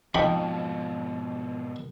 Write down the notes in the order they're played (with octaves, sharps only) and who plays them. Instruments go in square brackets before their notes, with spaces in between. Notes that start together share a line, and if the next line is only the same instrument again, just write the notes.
[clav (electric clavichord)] F2 [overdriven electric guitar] G#2 B2 [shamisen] D#4 G5 [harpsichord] B5